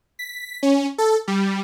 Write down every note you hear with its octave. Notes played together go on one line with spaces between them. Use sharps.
B6
C#4
A4
G3